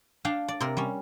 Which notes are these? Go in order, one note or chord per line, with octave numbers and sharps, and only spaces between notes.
D4 F5 G5 A5
D5
C3 C4 A#4
G3 C#4